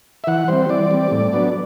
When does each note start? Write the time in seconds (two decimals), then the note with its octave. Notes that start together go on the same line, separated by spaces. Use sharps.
0.24 E5
0.27 E3 F#5
0.48 G3 C4 C5
0.69 E3 D5
0.91 G3 C4
1.11 A2
1.33 F#3 B3 D4